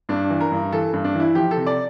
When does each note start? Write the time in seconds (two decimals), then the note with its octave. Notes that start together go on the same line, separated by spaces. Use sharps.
0.09 G2 D4
0.30 E3
0.41 A#4
0.52 G2
0.72 E3 A4
0.93 G2
1.04 D4
1.15 E3
1.20 E4
1.35 F3 G4
1.51 A4
1.57 C3
1.67 D5